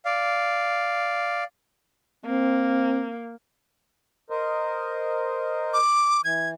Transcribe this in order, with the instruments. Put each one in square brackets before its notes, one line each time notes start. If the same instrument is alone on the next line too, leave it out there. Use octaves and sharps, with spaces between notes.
[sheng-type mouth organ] D5 F5
[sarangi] A#3 [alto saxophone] C4
[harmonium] A#4 C5 D#5
[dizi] D6
[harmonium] E3 [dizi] G#6